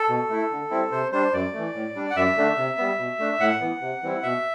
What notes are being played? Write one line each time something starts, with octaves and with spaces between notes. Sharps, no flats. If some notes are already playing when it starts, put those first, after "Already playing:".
Already playing: A4
B2
A3 E4
D3
G3 C4 E4
C3 C5
G3 D4 C5
F#2 D5
E3 A3
A2
G3 D4
F#5
F#2 E5
D3 A3 D4
C3
G3 B3
B2
A3 D4
A2 F#5
E3 B3
C3
E3 G3 C4 E4
B2 E5